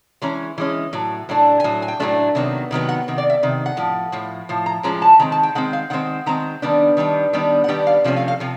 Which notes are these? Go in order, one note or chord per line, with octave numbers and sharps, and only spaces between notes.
E3 G#3 C#4 A#5
E3 G#3 C#4
A2 F#3
A2 F#3 A3 D4
G#5
A2 F#3
G#5
G5
A2 F#3 A3 D4
C3 D#3 F#3 B3
C3 D#3 F#3 B3
F#5
C3 D#3
D5
E5
C3 D#3
F#5
A2 F3
A2 F3
A2 F3
A#5
A2 F3 G#3 C#4 A#5
A5
D#3 G#3 C4 A#5
A5
G5
D#3 G#3 C4 F#5
F5
D#3 G#3 C4 F#5
D#3 G#3 C4 A#5
D#3 G3 B3 D4
D#3 G3 B3 D4
D#3 G3 B3 D4
F#5
D#3 G3 B3 D4 G5
F5
C3 F3 A3 C#4
F5
F5
C3 F3